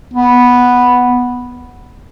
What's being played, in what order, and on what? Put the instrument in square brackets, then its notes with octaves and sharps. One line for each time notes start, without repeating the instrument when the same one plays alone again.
[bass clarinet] B3